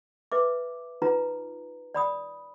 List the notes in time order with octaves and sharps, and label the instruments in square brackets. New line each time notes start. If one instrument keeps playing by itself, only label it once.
[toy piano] B4 E5 D6
D#4 F4 B4 A#5
D5 B5 D#6